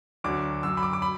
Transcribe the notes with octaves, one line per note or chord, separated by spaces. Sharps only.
D2 D3 F#3 D6
F#2 F#3 E6
B5
D6
D6
B5